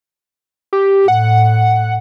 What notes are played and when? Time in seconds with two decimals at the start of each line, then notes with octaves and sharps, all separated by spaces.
0.73 G4
1.08 A2 F#5